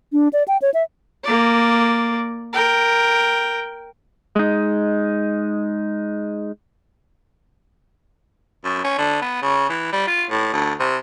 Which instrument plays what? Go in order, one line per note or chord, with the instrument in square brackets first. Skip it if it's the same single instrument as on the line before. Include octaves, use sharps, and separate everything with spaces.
[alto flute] D4
D5
G5
C#5
E5
[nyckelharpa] A#3 D5
A#4 G5
[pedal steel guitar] G#3 D#4
[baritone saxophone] F#2
C#4
D3
B3
C#3
E3
G3
F4
A2
D2
C3